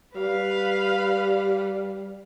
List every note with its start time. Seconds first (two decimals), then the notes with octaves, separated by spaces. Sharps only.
0.16 G3 B4 F5